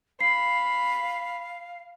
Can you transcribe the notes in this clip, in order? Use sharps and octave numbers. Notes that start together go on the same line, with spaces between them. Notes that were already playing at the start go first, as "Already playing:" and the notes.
F5 B5 C7